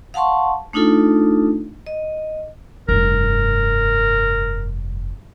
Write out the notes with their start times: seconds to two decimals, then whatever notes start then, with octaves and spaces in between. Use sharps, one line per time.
0.14 F5 F#5 A5 C6 C#6
0.73 A3 D4 D#4 F4 A4
1.87 D#5
2.89 F1 G2 A#4